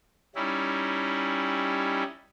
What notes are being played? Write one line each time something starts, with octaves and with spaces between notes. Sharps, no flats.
G3 C#4 D#4 E4